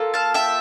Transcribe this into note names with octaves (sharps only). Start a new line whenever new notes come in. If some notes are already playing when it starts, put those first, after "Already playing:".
Already playing: A#3 F4 A4
F5 A5
E5 G5